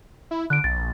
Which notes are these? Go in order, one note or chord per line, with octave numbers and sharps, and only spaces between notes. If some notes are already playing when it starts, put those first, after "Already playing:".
E4
D3 F#6 D7
B1 A6
A#1